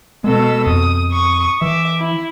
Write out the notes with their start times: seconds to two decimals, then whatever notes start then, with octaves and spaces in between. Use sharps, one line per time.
0.24 B2 G#3 A4 E6
0.67 F2 D#6
1.10 C#6 D#6
1.62 E3 E5 D6
2.00 E4